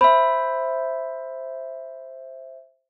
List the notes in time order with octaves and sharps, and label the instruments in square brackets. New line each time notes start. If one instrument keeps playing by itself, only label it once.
[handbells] C5 E5 [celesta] B5